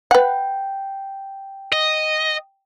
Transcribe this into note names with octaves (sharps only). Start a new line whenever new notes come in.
B4 F#5 G5
D#5